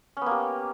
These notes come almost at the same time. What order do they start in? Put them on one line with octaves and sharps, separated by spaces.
C#4 B3 A#3 G4